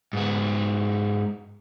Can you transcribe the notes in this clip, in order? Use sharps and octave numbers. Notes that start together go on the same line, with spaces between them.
G#2 B3